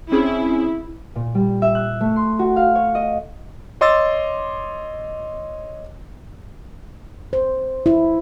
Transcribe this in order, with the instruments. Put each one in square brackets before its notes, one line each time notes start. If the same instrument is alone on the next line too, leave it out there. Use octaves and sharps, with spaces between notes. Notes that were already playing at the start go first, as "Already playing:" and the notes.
[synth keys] C4 C#4 G#4 [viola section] E4
[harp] A#2
G3
E5
F#6
A3
C6
F#4
F5
C#5
D#5
[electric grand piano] C#5 D#5 C6 D6 E6 A6
[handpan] C5
E4